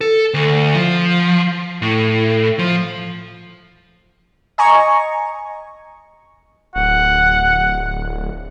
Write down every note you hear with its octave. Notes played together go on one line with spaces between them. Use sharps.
A4
D2
F3
A2
F3
D#5 G#5 A#5 C#6
D1 F#5